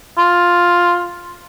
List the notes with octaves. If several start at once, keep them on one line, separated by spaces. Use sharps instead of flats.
F4